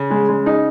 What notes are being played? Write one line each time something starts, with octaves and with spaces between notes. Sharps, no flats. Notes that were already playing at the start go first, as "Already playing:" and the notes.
Already playing: C#3
G#3
G#3
D#4